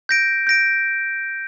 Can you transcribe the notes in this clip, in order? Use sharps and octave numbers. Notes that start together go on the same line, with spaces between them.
G6 A#6 D7
G6 A#6 D7